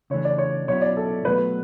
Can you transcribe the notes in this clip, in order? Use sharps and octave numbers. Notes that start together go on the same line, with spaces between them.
C#3 E3 A3 D4 C#5
D5
C#5
B2 F#3 C#4 E4 C#5
D5
A4
B2 F#3 A3 B4